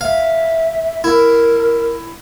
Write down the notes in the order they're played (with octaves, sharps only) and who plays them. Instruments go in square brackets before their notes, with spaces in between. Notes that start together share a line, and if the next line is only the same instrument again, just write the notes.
[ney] E5 [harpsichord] F5
[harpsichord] E4 [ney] A#4